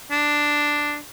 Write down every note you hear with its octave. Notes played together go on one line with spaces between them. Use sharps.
D4